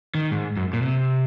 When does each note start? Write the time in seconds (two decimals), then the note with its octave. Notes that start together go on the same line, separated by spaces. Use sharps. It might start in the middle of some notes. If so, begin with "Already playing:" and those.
0.15 D#3
0.31 G#2
0.57 F#2
0.73 A#2
0.82 C3